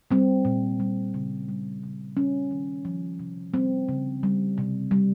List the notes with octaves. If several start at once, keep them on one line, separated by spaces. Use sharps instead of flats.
G3 C4
A#2
G3
C#3
G3
C#3
G3 C#4
D#3
F3
C3
G3 C4
C#3
G3
C3
G3